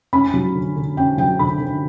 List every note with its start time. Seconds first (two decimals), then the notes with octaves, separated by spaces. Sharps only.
0.13 C#4 B5
0.34 F#3
0.55 D3
0.76 D3
0.97 C#4 G5
1.18 F#3 G5
1.39 D3 B5
1.60 D3